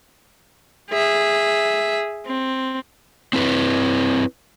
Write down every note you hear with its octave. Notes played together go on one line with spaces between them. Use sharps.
G#4 E5
C4
C4 E4 B4